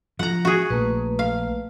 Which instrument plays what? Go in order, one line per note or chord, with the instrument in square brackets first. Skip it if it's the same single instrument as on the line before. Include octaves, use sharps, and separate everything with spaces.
[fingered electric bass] F3 [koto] F#5 A#5
[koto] F#4 G#4
[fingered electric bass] A#1 [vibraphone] A3 A#3 B4
[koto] F5